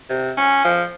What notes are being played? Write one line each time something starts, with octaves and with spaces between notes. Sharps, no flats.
C3
C#4
F3